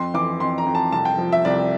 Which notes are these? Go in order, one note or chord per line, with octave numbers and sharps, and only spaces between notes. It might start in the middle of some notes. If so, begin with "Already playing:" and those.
Already playing: F2 C6
E3 D6
F2 C6
A#5
F2
A5
C2 A5
G5
F3
E5
C2 D5